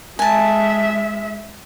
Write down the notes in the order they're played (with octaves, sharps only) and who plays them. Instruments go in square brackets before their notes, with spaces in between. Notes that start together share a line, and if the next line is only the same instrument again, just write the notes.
[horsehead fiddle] G#3 E5 [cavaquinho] G#5 A5